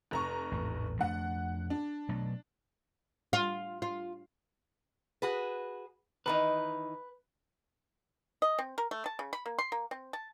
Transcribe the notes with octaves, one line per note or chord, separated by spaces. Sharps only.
F1 A#5 C#6
A1 E2 G#2
F2 A3 D4 F#5
D4
B2 F#3 A3
F4
F4
F#4 G#4 B4
D#3 E3 D#4 B4
D#5
C4
A#4
A3
A5
C#3
B5
A#3
C6
A#3
C4
A5